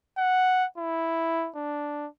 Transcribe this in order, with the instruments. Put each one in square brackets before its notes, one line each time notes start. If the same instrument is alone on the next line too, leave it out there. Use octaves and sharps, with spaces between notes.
[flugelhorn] F#5
E4
D4